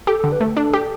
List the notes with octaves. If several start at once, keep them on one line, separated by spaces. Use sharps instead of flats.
G4 A4
A4
D3
B4
A3 A4
D4 A4
G4